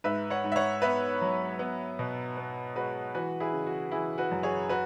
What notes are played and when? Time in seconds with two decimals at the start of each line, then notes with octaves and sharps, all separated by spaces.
0.04 G#2 B4 E5
0.30 C#5 F#5
0.44 G#2
0.52 E5
0.56 C#5 F#5
0.82 B3 B4 E5
1.21 F#3
1.59 B3
1.99 B2
2.37 B3
2.75 G#3 F#4 B4
3.14 E3 F#4 B4
3.40 E4 G#4
3.53 C#3
3.66 F#4
3.92 E3 E4 G#4
4.18 F#4 B4
4.31 F#2
4.43 G#4 C#5
4.69 F#4 B4